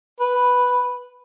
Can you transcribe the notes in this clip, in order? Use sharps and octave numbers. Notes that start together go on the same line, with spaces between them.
B4